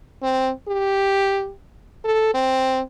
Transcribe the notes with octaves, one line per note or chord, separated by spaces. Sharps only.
C4
G4
A4
C4